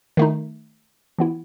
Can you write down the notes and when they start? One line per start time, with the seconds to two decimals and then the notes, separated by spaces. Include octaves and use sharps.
0.17 D#3 A3 D#4
1.18 E3 B3 E4